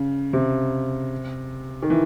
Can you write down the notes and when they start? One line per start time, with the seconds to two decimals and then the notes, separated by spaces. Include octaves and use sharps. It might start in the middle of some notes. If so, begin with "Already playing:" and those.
Already playing: C#3
0.33 C3
1.83 D#3
1.90 E3